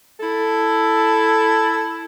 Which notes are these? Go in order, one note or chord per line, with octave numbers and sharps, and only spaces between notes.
E4 A4